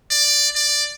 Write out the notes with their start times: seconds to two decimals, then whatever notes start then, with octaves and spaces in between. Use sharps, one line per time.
0.11 D5
0.55 D5